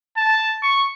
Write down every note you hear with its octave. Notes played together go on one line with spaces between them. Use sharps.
A5
C#6